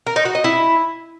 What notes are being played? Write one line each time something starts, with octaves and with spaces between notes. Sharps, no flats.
A#4
D#4
F#4
D#5
E4